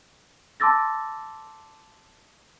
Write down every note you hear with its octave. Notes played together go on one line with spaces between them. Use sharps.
A5 C6 D6 E6 A6 A#6